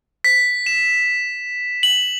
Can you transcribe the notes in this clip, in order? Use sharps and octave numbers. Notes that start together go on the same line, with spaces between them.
B6
E7
F#7